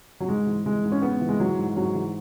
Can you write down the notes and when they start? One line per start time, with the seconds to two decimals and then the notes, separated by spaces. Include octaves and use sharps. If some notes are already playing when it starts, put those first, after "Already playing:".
0.20 F#3
0.28 G#2 G#3
0.47 E3
0.66 E3 G#3
0.84 G#2
0.92 C#4
1.02 G#2 B3
1.21 E3
1.29 G#3
1.40 E3 F#3
1.58 G#2
1.76 G#2 F#3
1.95 E3